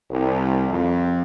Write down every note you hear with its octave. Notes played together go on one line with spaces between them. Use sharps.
C2
F2